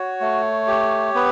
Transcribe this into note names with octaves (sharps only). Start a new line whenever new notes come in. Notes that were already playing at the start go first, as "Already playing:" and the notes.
Already playing: F#4 C#5
A3
G4
B3 B4